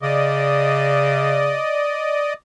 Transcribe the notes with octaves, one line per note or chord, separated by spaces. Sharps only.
C#3 D5 D#5